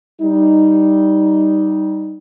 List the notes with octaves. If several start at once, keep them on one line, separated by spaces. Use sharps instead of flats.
G3 D#4